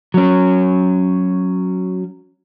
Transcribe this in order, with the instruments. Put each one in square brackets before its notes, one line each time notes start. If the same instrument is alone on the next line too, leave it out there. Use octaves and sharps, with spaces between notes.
[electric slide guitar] F#3 C#4